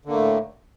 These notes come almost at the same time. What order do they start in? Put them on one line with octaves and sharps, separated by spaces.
D3 A#3 A3 A2